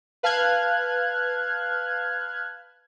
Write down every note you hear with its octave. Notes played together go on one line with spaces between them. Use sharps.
B4 F5 A5 F6 F#6 G#6